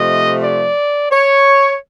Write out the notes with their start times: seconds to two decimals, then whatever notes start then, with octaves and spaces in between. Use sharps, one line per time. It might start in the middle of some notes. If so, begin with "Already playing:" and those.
Already playing: C3 F3 A3 D#5
0.43 D5
1.12 C#5